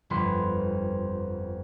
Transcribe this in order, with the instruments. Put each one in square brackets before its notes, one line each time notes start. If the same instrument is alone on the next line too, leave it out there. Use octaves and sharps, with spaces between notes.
[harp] G1 F2 B4 C6